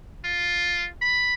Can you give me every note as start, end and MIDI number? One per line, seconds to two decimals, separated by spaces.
0.25 0.88 65
1.02 1.34 83